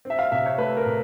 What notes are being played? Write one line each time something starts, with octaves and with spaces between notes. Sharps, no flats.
C4 E5
F5
C3 E5
C#5
A3 B4
A#4
C3